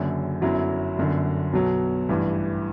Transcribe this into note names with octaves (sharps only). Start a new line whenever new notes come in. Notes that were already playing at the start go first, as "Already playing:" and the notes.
Already playing: F#1 F#2 D3
G1 F#2 F#3 E4
G1 F#2 D3
B1 B2 F#3
A1 G2 E3